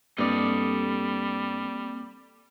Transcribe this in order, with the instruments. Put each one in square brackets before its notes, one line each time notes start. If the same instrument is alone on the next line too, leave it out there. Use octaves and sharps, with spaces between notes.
[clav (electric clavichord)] G2 D5 [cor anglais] G3 [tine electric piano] A#3 C4 [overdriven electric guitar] A4 D#5